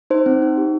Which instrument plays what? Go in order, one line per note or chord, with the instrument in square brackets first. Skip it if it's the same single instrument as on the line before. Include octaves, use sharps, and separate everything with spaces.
[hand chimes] D#4 C5
C4
D#4
G4